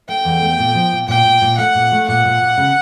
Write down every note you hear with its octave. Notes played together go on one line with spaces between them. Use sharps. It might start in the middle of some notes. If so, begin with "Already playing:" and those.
A3 G5
E2
A3
A#2
F3
A#2
A#2 G5
A#2
A#2
A3 F#5
A#2
A3
A#2 F#5
A#2
A#2
C#3